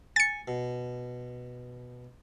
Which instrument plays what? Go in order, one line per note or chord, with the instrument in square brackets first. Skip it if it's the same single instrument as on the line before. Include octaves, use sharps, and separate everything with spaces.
[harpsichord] G#5 [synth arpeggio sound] A6 C#7
[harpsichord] B2